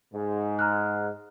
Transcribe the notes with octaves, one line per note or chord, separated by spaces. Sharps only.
G#2
A#5 F6 F#6